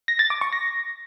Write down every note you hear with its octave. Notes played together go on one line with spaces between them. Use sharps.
A#6
A6
D6
C#6
A#6